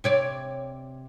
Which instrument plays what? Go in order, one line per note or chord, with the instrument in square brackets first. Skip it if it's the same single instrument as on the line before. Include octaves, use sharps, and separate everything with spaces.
[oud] C3 C#5 D5